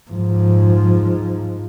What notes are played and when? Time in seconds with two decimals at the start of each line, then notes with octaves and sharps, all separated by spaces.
0.11 G#2 F3